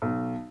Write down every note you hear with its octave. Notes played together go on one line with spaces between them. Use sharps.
B1